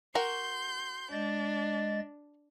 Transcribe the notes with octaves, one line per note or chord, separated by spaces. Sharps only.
F#4 A#4 A#5 C6 G6
G#3 D4 D#5 A6